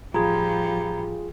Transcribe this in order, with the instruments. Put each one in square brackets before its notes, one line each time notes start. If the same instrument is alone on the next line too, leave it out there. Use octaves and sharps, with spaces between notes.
[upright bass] A1 [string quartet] F3 G3 [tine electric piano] F4 G#4 [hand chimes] A#5 B5 G#6